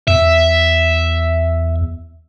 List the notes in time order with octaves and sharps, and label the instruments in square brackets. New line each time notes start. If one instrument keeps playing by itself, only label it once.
[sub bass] E2 [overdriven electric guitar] E5